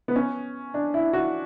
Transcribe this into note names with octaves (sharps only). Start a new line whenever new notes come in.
B3
C#4
D4
E4
F#4